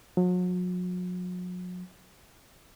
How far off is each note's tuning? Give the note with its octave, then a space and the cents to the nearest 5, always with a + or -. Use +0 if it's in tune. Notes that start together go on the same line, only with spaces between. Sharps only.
F#3 -40